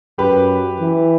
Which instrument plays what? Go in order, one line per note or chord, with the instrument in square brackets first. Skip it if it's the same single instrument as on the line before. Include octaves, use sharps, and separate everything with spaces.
[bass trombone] F#2 [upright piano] G4 B4
[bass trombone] E3